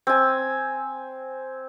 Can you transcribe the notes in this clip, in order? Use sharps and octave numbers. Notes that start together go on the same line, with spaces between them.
C4 G#5